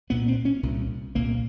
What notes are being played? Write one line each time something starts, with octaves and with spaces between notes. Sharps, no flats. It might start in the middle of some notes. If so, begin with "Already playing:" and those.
C2 A#2 B3
C4
C#4
C2 A#2
C2 A#2 A#3